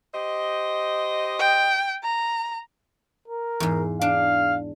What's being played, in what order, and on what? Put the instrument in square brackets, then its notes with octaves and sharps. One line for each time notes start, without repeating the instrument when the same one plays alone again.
[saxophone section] G4 C5 D#5
[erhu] G5
A#5
[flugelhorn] A#4
[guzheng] E2 G#2
[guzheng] D4 [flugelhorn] F5